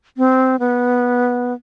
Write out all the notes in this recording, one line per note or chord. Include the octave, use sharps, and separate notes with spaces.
C4
B3